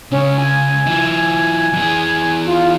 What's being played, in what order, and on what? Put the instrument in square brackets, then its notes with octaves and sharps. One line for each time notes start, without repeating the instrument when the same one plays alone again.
[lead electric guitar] C#2 C#3 [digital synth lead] C#4
[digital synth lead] G#5
[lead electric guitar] F3 E4
E3 G#4
[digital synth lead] F4